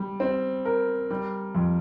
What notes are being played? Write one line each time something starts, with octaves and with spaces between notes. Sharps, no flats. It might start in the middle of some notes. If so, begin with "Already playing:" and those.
Already playing: G3
C4
A#4
G3
F2